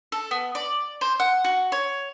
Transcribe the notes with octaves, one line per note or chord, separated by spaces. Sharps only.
A4
B3
D5
C5
F#5
F#4
C#5